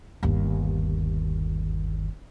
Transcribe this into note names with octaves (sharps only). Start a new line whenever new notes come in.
G1 D#2